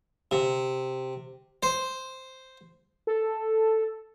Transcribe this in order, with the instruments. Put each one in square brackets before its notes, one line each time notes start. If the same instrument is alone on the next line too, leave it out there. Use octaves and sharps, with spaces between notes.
[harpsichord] C3
C5
[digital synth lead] A4